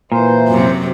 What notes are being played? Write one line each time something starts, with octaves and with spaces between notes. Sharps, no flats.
A#2 E3 C5
F#2 C3 F#3